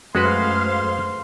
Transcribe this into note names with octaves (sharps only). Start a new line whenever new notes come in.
F#2 G#3 A3 F#4 B4 C5 F5 C6